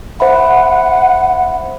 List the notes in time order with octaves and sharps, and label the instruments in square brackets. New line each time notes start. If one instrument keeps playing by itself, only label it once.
[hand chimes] C5 E5 B5 [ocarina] F#5